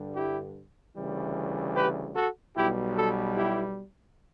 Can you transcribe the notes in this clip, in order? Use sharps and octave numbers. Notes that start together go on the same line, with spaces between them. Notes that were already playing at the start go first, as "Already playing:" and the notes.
Already playing: G2 D3 G3
E4 G4
D2 C#3 E3 G3
G4 B4
F#4 A4
B1 B2 G3 E4 G4
F#4 A4
E4 G4